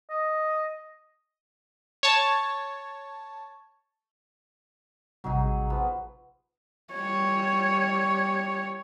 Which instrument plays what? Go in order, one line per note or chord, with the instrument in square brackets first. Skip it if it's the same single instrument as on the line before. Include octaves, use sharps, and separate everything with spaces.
[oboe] D#5
[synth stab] C#5 A5
[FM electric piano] A1 C3 G3 [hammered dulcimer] F#3 D#4 G#4
[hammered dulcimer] F3 B3
[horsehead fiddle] G3 C#5